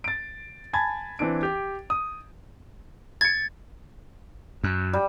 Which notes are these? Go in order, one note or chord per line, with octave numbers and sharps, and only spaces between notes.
A6 D7
G#5 A5 B5 G#6 A6
E3 C4 D4 D7
G4
D#6
G#6 A6 C#7
F#2
G3